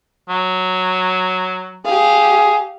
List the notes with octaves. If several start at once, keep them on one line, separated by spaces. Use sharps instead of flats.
F#3
G4 G#4 F5